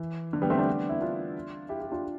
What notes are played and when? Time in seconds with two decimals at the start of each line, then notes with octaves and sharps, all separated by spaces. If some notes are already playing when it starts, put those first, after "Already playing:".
Already playing: E3
0.33 D3
0.42 G3 B3
0.50 A3 C4
0.59 B3 D4
0.89 E4
1.01 D4 F4
1.69 E4 G4
1.81 E4 G4
1.92 D4 F4